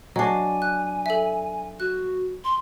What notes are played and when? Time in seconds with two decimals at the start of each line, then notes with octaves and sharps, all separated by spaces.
0.16 F#3 D4 D#5 G#5 C7
0.62 F#6
1.06 A4 E5
1.80 F#4 F#6
2.44 C6